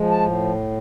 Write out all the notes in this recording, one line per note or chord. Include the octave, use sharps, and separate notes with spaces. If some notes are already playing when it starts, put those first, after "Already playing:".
Already playing: F3 G#3
A5
A2